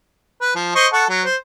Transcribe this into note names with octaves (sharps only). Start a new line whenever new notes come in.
B4
F3
C5 D#5 C#6
A4 F#5 C#6
F#3
C5